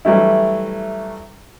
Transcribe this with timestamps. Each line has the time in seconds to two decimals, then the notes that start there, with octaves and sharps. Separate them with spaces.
0.05 E3 F#3 G3 A3 E4